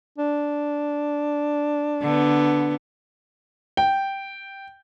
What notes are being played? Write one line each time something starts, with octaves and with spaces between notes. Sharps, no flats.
D4
D3 B3
G5